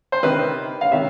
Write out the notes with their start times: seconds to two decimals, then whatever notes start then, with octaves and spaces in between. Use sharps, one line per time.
0.12 C5
0.23 C3 D#3 B4
0.81 F5
0.91 C3 D#3 E5